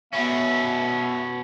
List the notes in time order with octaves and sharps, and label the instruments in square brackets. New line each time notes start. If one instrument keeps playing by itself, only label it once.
[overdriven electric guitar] B2 C#4 [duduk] B3 [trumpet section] E5